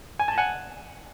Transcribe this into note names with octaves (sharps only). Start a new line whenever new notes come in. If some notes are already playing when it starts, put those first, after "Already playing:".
G#5
A5
F#5 G#5